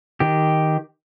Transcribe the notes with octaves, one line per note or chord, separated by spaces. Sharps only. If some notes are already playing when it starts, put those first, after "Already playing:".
D#3 G4